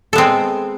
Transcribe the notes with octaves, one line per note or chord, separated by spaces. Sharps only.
G#3 B3 C4 A4